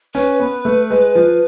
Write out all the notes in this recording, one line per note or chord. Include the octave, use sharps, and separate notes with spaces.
C#4 B4
B3
A3
G#3
F3